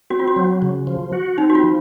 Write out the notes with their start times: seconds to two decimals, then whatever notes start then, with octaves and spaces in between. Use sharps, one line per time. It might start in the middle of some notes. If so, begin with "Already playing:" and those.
0.10 C4 F#4
0.19 F4
0.27 F#4
0.36 F#3
0.62 C#3
0.87 F3
1.13 F#4
1.38 C4 D#4
1.50 F#4
1.55 F4
1.64 F3